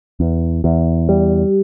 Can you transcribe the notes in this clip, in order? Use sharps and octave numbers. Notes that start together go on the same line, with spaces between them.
E2
E2
G3